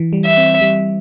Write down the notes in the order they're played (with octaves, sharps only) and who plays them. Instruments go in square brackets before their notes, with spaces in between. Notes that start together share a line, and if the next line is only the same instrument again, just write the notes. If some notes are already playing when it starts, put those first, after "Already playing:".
Already playing: [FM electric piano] E3
G3
[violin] E5
[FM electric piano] C4
G3